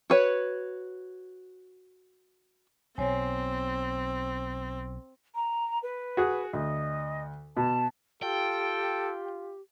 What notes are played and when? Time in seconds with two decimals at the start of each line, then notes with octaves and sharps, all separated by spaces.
0.10 F#4 B4 C#5
2.98 B1 B2 C4 C#5 G#5
5.35 A#5
5.83 B4
6.17 F#4 G#4
6.53 D2 D#5
7.57 B2 A5
8.23 F4 G4 A4 G5